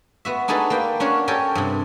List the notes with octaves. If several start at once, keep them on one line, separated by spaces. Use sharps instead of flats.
B3 F#4 E5
D4 D#4 F#4 G#4 A4 B4
A#3 B4 G5
C#4 D4 F#4 C#5 F5
G4 A4 A#4 C#5 G5 G#5
G2 C3